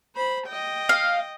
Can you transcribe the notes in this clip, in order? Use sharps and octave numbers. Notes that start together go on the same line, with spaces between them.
C5 B5
D#5 G5
F5